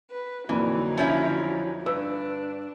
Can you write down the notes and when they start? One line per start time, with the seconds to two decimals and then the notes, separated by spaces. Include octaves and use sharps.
0.10 B4
0.49 F2 A#2 D3 E3 F#3 D#4
0.97 F3 C#4 E4
1.86 G2 D4 B4 E6